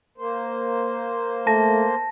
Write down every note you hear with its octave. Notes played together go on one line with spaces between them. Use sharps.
A#3 C5
A3 A5 A#6